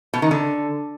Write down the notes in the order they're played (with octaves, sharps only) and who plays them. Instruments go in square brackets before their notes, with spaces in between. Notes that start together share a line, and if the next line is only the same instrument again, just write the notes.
[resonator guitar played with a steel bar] B2
D#3
D3